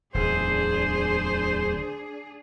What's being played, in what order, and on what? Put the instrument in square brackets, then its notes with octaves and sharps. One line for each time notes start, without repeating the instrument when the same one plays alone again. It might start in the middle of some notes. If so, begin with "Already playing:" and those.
[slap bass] D1 E2 [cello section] D4 G#4 [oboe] C5